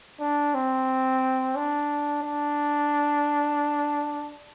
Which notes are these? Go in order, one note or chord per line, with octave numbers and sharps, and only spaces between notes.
D4
C4
D4
D4